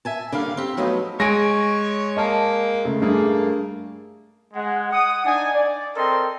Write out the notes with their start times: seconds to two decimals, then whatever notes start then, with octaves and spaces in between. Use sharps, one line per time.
0.05 E5 G#5 A5
0.32 D3 G3 A#3 F5
0.57 C4 G4
0.77 F3 F#3 A3 B3 D#4
1.20 G#3 C#5 G#5 A#6 D7
2.17 A#3 D#5 A5
2.85 C#3 A3
3.02 G2 A3 A#3 G#4
4.54 G#3 F#5
4.91 F#5 D#6
5.25 D4 D#4 G#5
5.54 D5
5.95 C4 A4 A#4 D#5 G5 C6